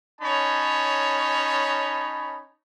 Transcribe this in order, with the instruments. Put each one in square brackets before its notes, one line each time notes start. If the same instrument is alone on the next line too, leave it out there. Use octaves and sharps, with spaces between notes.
[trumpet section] C#4 D#4 C#5 A5 B5